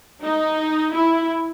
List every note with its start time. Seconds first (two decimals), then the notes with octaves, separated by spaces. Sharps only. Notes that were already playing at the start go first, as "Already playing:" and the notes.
0.22 D#4
0.94 E4